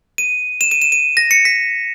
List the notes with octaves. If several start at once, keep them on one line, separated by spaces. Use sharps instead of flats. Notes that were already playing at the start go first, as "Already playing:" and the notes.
D#7
E7
D#7
E7
D#7
A#6
C#7
B6